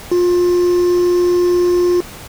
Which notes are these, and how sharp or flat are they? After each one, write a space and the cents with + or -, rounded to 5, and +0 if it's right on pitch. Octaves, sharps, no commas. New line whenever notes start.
F4 +25